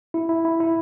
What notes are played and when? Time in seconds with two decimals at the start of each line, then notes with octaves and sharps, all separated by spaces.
0.14 E4
0.29 E4
0.45 E4
0.60 E4